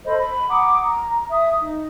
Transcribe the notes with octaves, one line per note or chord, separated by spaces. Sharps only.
A4 C5 D#5 B5
B5
F#5 A#5 D6 D#6
A#5
E5 D#6
D#4